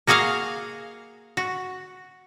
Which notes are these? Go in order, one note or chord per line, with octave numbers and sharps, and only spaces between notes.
A#3 F#4 G#4 D#5 F5
F#4